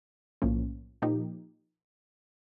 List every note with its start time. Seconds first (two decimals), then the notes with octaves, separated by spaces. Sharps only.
0.42 B1 A2 F3 A#3 C#4
1.02 A#2 F3 A#3 D#4 G4